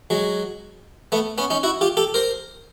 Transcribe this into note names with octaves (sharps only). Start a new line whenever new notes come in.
F#3 G#3
A3 B3
B3 C#4
C#4 D#4
E4 F#4
F4 G4
G4 A4
A#4 C5